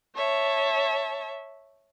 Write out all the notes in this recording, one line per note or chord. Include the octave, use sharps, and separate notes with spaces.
C#5 E5 A5